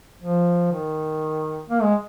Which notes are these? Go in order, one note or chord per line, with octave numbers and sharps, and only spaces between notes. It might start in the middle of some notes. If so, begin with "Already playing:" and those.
F3
D#3
A#3
G#3